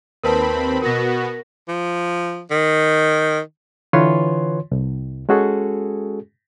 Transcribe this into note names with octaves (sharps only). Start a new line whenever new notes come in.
D#2 C4 A#4 B4 A5 B5
B2 B3 F#4 A#4 A#6
F3
D#3
D3 E3 F4 B4 C#5 C6
C2
G#3 C#4 F#4 G#4 A4